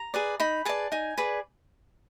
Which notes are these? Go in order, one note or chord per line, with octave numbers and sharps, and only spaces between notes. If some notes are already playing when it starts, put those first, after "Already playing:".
Already playing: A#5
G#4 B4 D5
D#4 B5
G#4 B4 D5 A5
D#4 G#5
G#4 B4 D5